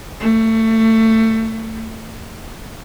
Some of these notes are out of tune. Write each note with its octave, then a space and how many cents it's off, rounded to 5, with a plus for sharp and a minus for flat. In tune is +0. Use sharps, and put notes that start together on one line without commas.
A3 +25